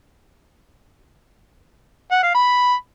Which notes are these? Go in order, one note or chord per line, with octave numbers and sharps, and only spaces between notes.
F#5
F5
B5